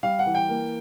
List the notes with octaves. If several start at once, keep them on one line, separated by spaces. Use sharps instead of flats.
G3 F5
F#5
E3
G5
A#3